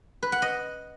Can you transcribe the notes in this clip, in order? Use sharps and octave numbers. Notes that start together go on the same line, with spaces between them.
B4
F#5
D#5